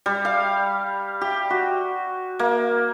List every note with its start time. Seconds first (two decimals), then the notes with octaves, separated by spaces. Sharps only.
0.06 G3
0.25 F5
1.21 G4
1.50 F#4
2.39 A#3